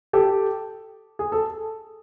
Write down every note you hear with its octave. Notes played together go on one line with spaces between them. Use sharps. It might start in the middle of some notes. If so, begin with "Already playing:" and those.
G4 A4
G#4
A4